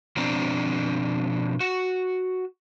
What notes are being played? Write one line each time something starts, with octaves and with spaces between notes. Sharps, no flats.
B2 F3 C4 D4 D5 A#5
F#4